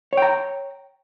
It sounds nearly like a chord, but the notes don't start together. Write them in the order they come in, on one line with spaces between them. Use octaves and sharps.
C#5 G5 A#5